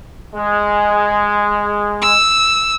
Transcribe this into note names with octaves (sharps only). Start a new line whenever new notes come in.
G#3
E6